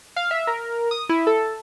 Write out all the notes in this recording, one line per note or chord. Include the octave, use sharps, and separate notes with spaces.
F5
E5
A#4
D#6
E4
A4